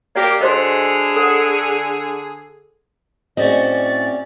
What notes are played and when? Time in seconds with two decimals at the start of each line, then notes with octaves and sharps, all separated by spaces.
0.16 A#3 G4 D5
0.41 D3 F#4 G#4 C5 D#5
1.16 A4 F#5
3.37 A2 C4 C#4 F#4 G#4 D5 D#5